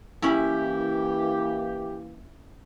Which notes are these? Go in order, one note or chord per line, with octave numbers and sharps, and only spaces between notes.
E3 A#3 C#4 E4 G4 B5